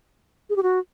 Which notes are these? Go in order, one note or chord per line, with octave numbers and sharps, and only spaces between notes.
G#4
G4
F#4